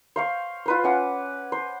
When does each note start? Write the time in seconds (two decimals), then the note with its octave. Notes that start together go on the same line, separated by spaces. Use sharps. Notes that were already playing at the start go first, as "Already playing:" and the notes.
0.16 C5 F5 C#6
0.66 F4 B4 C5
0.84 C#4 F#5 D6
1.52 C5